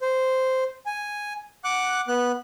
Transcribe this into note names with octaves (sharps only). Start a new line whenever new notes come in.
C5
G#5
F#5 D6 F#6
B3 F#6